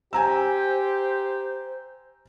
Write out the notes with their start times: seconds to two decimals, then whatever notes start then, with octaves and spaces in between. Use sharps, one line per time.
0.13 G4 C5 G#5 A#5 E6